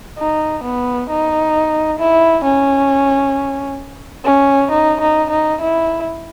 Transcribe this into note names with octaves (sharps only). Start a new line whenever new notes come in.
D#4
B3
D#4
E4
C#4
C#4
D#4
D#4
D#4
E4